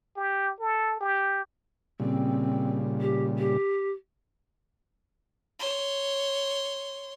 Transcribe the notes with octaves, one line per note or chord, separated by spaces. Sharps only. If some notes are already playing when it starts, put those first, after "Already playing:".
G4
A4
G4
A#2 C#3 G3 C4
G4
G4
C#5 C6